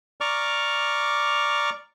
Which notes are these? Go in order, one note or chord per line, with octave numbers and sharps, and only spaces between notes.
D5 A#5 C#6 D6 F6